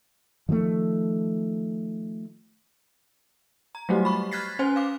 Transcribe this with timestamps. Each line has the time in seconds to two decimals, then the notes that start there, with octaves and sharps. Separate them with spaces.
0.49 D#3 F3 G3 A3
3.75 A#5
3.89 F#3 G3 A3 F#4 G4
4.05 B5 C#6
4.31 F6 F#6 G#6 A6 B6 C7
4.59 C#4 C5 G#5
4.76 F5 D6